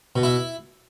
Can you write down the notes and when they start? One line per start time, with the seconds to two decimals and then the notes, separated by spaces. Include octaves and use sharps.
0.16 B2
0.23 E4